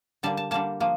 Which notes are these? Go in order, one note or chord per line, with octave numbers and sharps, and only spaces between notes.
D3 G3 A#3 A5
A5
D3 G3 A#3 A5
F3 A#3